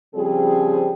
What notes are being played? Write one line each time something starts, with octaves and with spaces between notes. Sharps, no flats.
C#3 F3 G3 C4 G#4